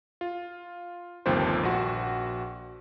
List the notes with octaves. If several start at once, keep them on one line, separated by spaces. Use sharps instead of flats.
F4
G1 D#2 C3 F3 G4 C5
A#1 F#4